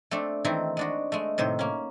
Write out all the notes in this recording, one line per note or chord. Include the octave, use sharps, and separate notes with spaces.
A3 C4 D4 A4
D#3 E3 A3 C4
G#3 D4 F#4
G#3 A3
A2 C3 D#3 C5
A#3 C#4